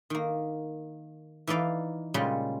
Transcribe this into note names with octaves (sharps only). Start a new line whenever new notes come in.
D#3 A#3
E3 D#4 B4 D5 F5
A#2 C#3 G3 G#3 C#4 F4